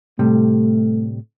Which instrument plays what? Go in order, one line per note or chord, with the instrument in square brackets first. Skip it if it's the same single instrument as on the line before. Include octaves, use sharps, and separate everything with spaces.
[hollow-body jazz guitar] A2 C3 G3 [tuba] A3